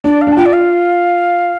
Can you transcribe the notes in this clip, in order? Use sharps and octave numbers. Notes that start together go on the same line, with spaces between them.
D4 D5
F5
D4
A5
F4 G5
D5
F5